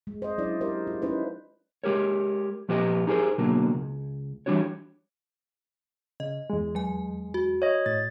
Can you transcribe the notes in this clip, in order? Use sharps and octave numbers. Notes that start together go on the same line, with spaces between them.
G#3
C5 D#5
F#3 C#4 D4 E4 D5
G4 A#4 C5 D5
F4
C#4 D#4 E4 B4 C5
G#3 G4 A#4 C#5
A#2 F3 G4 B4 C#5 D#5
D#4 G4 G#4 A#4 C5
B1 B2 D3 F#3 A#3
C#2
E3 F3 G3 D4 F#4 C#5
C#3 D#5
E2 G#3
F#3 G#5
F#4
C#5 D#5
A2 A6